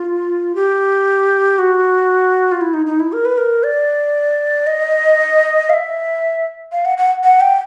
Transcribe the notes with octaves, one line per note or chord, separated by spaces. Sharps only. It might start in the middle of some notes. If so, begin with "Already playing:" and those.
Already playing: F4
G4
F#4
F4
E4
D#4
D#4
E4
A#4
B4
A#4
D5
D#5
F5
E5
F5
F#5
F#5
F#5
G5